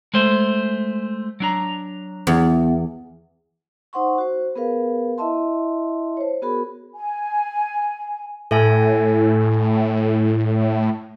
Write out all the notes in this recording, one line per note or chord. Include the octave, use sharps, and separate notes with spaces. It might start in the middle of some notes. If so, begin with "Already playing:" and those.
G#3 A3 C5
F#3 D4 A#5
E2
D#4 C5 F#5 C6 C#6
F#4 C5
B3 G#4 A#4 B4 F5
E4 D#5 E5 A5 C6
C5 C#5
B3 F#4 G#4 A#4 B5
G#5
A2 A4 E5 G#5